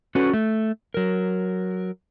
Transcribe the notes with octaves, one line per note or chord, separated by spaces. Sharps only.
C#4 F#4 A4 B4
A3
F#3 A#4